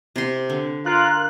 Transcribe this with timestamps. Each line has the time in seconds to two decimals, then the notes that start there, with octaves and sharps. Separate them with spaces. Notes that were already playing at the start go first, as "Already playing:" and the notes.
0.16 C3 C6
0.50 D3
0.86 F4 A#4 F#6